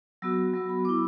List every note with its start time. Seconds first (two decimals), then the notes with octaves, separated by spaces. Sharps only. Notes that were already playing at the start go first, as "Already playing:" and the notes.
0.22 F#3 B3 F#4 E6
0.54 F#3 B3 F#4
0.69 B5
0.85 B3 D6
0.89 E4